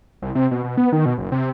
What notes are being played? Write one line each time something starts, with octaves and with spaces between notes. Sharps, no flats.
C2
C3
B2
B2
B3
D#3
B2
F#1
C3